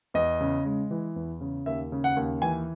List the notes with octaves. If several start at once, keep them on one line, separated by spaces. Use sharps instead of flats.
E2 D#5
C#3
G#3
E3
E2
C#3
D#2 E5
C#3
F#5
D#2
E3 G#5